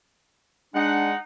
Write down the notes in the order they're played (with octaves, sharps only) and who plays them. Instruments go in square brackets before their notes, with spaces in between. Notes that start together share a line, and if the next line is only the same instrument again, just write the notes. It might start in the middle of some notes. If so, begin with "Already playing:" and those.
[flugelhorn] G#3 [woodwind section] D4 [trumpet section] D#4 F#5